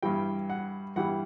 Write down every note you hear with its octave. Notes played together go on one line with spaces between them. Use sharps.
G2 E3 G3 G5
F#5
G2 E3 G3 F#5